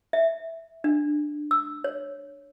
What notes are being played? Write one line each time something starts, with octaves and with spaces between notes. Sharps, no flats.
E5
D4
E6
C#5